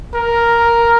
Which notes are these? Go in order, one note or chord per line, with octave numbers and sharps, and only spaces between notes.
A#4